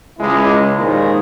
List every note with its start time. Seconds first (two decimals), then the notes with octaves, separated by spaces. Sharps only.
0.18 C#2 G#3 E4
0.77 D#2 A#2 D#3 F3 G#3